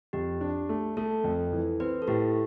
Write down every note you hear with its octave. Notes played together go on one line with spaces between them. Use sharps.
F2 G4
D4
A3
A3 A4
F2
E3
C4 B4
A4
A2 G4